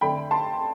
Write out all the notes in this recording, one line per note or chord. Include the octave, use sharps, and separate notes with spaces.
F2 D3 A3 G5 B5
A5 C6